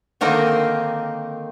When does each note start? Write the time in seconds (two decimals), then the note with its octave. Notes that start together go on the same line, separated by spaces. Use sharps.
0.21 D3 D#3 A#3 C4 D#4